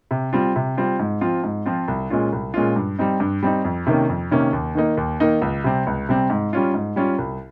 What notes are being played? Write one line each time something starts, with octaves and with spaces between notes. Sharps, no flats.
C3
G3 C4 F4
C3
G3 C4 F4
G#2
F3 C4 F4
G#2
F3 C4 F4
C2
A#2 G#3 C#4 F4
C2
A#2 G#3 C#4 F4
G2
G3 C4 D#4
G2
G3 C4 D#4
F2
C3 D#3 A#3 C#4
F2
C3 D#3 A#3 C#4
D#2
D#3 A#3 D#4
D#2
D#3 A#3 D#4
C#2
C3 G3 C4
C#2
C3 G3 C4
G#2
G3 C#4 F4
G#2
G3 C#4 F4
C2